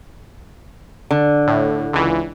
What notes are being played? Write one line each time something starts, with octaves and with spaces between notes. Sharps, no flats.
D3
A2
C#2 E3